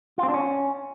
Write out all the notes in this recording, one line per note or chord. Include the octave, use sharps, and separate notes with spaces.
F4
C4
D4
C#4